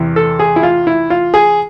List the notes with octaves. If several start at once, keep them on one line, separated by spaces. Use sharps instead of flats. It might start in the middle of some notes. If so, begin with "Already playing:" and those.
Already playing: E2 C3 E3
A4
G#4
E4
F4
E4
F4
G#4